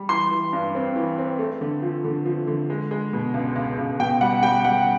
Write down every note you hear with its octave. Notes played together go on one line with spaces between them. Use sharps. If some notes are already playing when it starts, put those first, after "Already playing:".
Already playing: G3
E3 C6
E3
G2
C4
E3
C4
A3
D3
F3
D3
F3
D3
G#3
G#3
B2
C#2
C#2
C#2
B2 G5
G3 F#5
G3 G5
G3 F#5